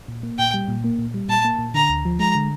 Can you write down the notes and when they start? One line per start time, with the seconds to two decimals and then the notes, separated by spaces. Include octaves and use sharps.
0.08 A#2
0.23 A#3
0.38 A#2 G5
0.54 G3
0.68 A#2
0.84 A#3
0.99 A#2
1.14 G3
1.29 A#2 A5
1.45 A#3
1.59 A#2
1.74 D3 A#5
1.90 D2
2.05 F3
2.19 G#3 A#5
2.35 D3